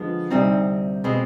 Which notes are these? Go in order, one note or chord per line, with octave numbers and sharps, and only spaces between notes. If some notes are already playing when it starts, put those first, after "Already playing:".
Already playing: D3 F3 G#3 B3
D2 C3 G3 C4 D#4
B2 G#3 C4